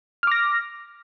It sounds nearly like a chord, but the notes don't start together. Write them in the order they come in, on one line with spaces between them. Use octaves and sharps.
F6 D6 A#6